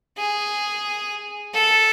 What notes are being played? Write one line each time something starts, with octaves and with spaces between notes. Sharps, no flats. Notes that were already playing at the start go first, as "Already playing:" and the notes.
G#4
A4